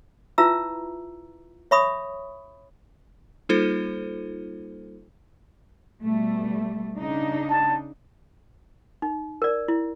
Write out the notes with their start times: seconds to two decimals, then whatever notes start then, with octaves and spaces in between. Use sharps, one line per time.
0.38 E4 F4 B4 E5 A#5 E6
1.71 C#5 E5 B5 C#6 D#6
3.49 G3 A#3 D#4 F4 A4 C5
6.04 B2 G3 A3
6.95 C#3 D4 D#4
7.50 A5
9.02 D#4
9.42 A#4 D5
9.68 E4